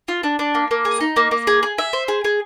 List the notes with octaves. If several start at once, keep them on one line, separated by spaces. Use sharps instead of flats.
F4
D4
D4
A#3
A#3
G#4
D#4
A#3
A#3
G#4
G#4
E5
C5
G#4
G#4